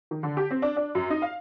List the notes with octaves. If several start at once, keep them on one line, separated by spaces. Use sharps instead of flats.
D#3
D3
G4
C4
D4
D4
F#2
D#4
F5